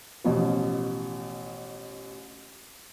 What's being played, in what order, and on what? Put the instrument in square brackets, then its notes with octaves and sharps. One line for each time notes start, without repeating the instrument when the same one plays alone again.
[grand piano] A1 B2 F3